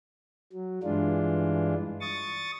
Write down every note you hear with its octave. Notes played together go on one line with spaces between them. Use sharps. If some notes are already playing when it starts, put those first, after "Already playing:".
F#3
G2 E3 G#3 D4 F4
C#6 D#6 A6